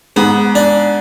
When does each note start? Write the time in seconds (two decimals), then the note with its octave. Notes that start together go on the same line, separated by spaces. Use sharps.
0.16 G#2 B3
0.55 D4